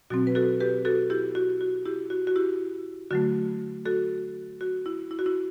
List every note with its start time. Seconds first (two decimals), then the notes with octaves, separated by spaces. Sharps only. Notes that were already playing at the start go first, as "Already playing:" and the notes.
0.10 B2 F#3 C4 F#4
0.27 B4
0.35 F#4 A4
0.60 G4 B4
0.85 F#4 A4
1.10 E4 G4
1.35 F#4
1.61 F#4
1.85 E4 G4
2.10 F#4
2.27 F#4
2.36 E4 G4
3.11 D3 F#3 A3 F#4
3.86 F#4 A4
4.61 F#4
4.86 E4
5.11 E4
5.19 F#4
5.26 E4